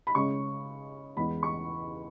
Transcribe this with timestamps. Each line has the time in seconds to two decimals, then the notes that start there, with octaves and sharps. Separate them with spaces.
0.07 B5
0.15 C#3 G#3 C#4 C#6
1.16 E2 E3 G#3 B5
1.43 C#6